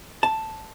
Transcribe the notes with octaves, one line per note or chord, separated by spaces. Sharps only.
A5